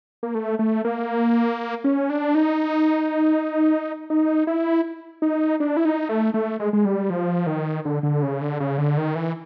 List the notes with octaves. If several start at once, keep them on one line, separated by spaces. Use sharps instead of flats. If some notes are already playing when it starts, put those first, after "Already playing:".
A#3
A3
A3
A#3
C#4
D4
D#4
D#4
E4
D#4
D4
E4
D#4
A3
A3
G#3
G#3
G3
F3
D#3
D3
D3
C#3
D3
C#3
D3
D#3
E3